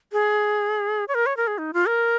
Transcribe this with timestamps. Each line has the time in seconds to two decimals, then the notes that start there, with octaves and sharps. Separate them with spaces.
0.12 G#4
1.08 C#5
1.15 A#4
1.26 C#5
1.37 A#4
1.47 G#4
1.58 D#4
1.74 F4
1.87 A#4